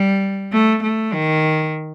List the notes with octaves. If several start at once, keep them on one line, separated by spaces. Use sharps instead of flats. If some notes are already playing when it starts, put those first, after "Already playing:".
Already playing: G3
A3
A3
D#3